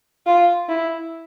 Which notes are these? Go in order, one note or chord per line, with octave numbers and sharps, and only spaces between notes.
F4
E4